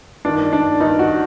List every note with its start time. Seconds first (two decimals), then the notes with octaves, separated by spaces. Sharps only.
0.25 G2 D#3 D4
0.53 D4
0.80 G2 D#4
0.84 D#3
0.99 F#4